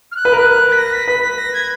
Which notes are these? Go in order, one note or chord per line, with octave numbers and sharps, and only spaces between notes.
F6
F#6
B4
A#4
B4
B6
A#6
B6
B4 B6
A#6
G#6